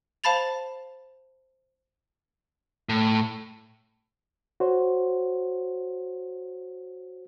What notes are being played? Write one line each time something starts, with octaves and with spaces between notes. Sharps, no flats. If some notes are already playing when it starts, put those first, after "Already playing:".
C5 F5 A5 B5 A6 F7
A2
F#4 C5 C#5